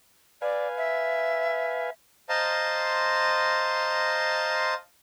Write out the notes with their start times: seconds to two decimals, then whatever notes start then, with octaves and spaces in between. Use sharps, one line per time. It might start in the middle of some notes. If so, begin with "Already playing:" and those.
0.42 B4 D5 F5 G#5
0.77 E5
2.29 C5 D#5 F5 A5 A#5 C6